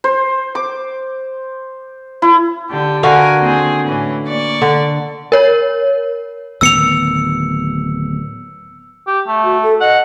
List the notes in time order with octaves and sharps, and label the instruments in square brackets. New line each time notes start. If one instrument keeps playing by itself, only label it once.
[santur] C5
D6
E4
[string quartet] D3 G4
[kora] D3 F#4 F5 [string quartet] A#4 G#5
[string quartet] D#2 C4 G#4
A2 E3 C#4
A#3 D5 C#6
[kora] D3
[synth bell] A#4 C#5
[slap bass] D1 D#3 B3 [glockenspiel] E6 C#7 F7
[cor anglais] G4
A3
[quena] F#4
A4
[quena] D#5 [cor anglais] F#5